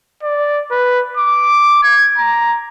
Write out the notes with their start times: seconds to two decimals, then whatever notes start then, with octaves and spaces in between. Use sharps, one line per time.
0.23 D5
0.71 B4
1.17 D6
1.84 G#6
2.18 A#5